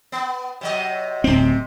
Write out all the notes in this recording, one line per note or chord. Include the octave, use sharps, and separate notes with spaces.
B3
C3 F#3 D#5
D1 C3 C4